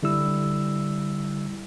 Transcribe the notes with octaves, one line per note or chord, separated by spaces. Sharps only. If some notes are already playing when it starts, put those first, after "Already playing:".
D3 G3 E4 E6